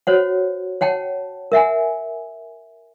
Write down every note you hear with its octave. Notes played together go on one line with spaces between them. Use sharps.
F#4 C5 C#5 F#5
C#5 F#5 G5 A5
A#4 E5 F#5 G#5